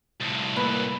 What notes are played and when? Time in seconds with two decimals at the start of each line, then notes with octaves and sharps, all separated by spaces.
0.21 C2 A2
0.56 A#3 B4